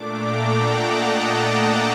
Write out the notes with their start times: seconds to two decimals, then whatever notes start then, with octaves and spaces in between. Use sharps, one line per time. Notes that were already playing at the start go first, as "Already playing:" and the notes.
Already playing: A#2 A3 D4 D6
0.10 G5 A#5
0.43 F#5 A5
0.75 D#5 G5
1.08 F#5 A5